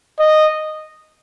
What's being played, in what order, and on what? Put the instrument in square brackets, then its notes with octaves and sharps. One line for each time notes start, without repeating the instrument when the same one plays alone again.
[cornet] D#5